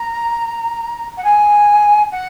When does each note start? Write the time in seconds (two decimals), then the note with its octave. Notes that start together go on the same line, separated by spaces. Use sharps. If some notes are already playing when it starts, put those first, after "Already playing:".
Already playing: A#5
1.17 F#5
1.24 G#5
2.12 F#5